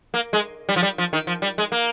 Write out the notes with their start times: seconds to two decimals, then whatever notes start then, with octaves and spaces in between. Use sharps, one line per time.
0.14 A#3
0.33 G#3
0.69 G3
0.76 F3
0.83 G3
0.98 F3
1.13 D#3
1.27 F3
1.42 G3
1.58 G#3
1.72 A#3